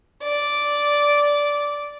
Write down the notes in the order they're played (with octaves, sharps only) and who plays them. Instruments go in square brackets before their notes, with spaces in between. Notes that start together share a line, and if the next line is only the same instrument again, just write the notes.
[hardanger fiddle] D5